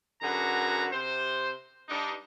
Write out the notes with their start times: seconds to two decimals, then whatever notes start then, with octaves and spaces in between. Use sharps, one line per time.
0.22 F#2 D3 F#4 G#4 B4 A#5
0.92 C3 C5
1.89 G2 D4 D#4